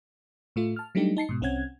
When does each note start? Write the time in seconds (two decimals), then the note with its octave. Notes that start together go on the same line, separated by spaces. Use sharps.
0.56 A2 A3 F4
0.76 A5 F6
0.95 F#3 G3 A3 D4 D#4 G4
1.17 D#4 A5 C7 C#7
1.29 G#2 B2
1.41 C2 C4 C#4 F#5 G#6